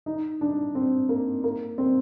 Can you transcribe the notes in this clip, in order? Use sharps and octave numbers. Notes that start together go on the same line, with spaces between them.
D#4
D4
C4
A#3
A#3
C4